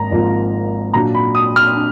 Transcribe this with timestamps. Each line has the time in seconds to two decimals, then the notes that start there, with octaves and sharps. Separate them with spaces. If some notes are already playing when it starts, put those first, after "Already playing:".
Already playing: G#1 G#2 A#3 A#5
0.11 G#1 G#2 F3 A#3 F4
0.93 A#2 F#3 D4 A#5
1.15 B5
1.35 D#6
1.56 F6
1.76 D4